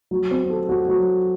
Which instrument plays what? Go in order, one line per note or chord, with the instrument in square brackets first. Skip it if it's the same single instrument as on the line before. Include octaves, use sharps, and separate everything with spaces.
[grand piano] F#3
C4
A4
F#4
F#3